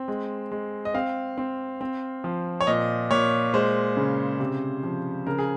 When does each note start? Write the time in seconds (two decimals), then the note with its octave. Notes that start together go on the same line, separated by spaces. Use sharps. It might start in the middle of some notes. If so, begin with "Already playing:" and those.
Already playing: C4
0.08 G#3
0.52 G#3
0.85 D#5
0.94 C4 F5
1.38 C4
1.81 C4
2.24 F3
2.61 C#5
2.67 A#2 D#5
3.11 A#2 C#5
3.54 G#3 C5
3.97 C#3
4.40 C3
4.83 F3
5.26 C#3 A#4
5.39 G#4